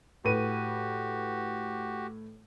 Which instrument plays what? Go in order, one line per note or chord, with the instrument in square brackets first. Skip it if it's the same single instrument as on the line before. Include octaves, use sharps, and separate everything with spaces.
[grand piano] A2 B4 D#7 [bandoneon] F#4 G4